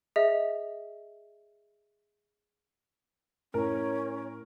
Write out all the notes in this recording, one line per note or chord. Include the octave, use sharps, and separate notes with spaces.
G#4 D#5 E5
A2 C#4 A#4